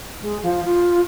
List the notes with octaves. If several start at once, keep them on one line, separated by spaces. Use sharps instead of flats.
G#3
F3
F4